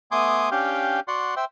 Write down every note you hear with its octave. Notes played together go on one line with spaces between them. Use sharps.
A3 B3 G#5 C6 D6 D#6
C#4 D4 G4 F5 G5
F#4 D5 F#5 C6
C5 E5 G5